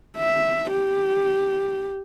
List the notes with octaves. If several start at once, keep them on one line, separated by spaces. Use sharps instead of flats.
E5
G4